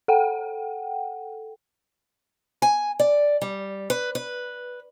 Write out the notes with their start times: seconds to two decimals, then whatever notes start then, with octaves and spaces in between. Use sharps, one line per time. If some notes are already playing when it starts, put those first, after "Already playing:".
0.08 A4 F#5 G5
2.62 G#5
2.99 D5
3.42 G3
3.90 B4
4.15 B4